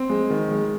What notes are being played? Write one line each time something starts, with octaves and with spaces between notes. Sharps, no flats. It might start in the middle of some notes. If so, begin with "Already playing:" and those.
Already playing: C4
G#3
D#3
G#3